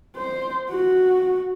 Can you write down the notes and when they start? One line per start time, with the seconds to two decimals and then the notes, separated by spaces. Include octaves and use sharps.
0.16 C5
0.70 F#4